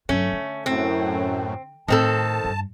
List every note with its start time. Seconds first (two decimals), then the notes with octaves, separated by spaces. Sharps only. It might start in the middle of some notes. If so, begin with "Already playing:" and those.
0.09 G1 F#3 A3 C#4
0.32 D3
0.66 F#2 A2 C4
1.88 A2 D#3 C4 A4 A5
2.44 G2